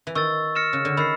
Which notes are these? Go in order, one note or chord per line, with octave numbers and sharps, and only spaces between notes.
E3
D#3 C#6 E6 A6
F6 A#6 C#7 E7
C#3
D3
D#3 B5 E6 A6 C7